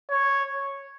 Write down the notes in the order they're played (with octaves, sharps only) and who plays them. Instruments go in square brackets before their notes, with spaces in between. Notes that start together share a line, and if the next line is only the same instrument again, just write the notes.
[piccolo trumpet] C#5